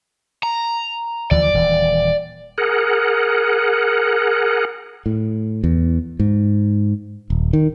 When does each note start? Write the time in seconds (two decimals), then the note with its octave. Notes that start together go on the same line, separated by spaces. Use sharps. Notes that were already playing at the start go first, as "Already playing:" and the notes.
0.43 A#5
1.31 D2 E3 F3 D5
1.54 D#1 E3
2.58 G#4 A#4 F#5
5.06 A2
5.64 E2
6.20 G#2
7.30 D#1
7.53 D#3